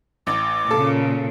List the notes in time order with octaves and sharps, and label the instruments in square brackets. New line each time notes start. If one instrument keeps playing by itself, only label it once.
[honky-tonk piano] A1 [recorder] D6
[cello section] A#2 C#3 [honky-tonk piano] A4